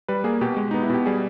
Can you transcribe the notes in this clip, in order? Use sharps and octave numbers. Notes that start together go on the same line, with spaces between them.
G3 B4
A#3 G#4
B2 G4
G#3
B3 D#4
E4
B2 G4
G3 G#4